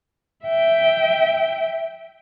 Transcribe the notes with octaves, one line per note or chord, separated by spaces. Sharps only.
E5 G5